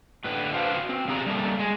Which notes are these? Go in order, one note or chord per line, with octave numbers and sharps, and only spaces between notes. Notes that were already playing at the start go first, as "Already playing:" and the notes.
A2 D3 B4
D4 F#4 B4 C5 F5 F#5
C4
E2 C3 G#4 D5 A#5
G3 A3 A#3
G#3